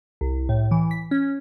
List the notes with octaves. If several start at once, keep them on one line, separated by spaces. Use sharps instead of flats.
C2
A2
E3
B6
C#4